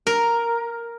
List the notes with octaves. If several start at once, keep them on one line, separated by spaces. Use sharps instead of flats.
A#4